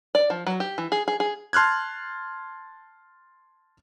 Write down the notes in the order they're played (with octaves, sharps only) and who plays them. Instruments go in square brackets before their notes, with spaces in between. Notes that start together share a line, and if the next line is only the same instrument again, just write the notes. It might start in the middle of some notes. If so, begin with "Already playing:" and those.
[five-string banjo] D5
F3
F#3
G4
E3
G#4
G#4
G#4
[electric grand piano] A5 C6 F6 F#6 G#6